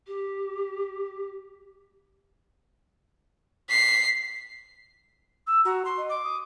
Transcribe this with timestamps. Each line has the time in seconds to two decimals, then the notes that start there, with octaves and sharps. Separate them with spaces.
0.07 G4
3.69 B6 C7
5.47 E6
5.65 F#4 A#5
5.85 C6
5.97 D#5
6.10 D6
6.23 D#6